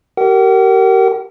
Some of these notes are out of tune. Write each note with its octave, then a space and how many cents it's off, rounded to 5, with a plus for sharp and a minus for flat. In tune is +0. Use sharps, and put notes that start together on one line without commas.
G4 -35 A#4 -20 F#5 +45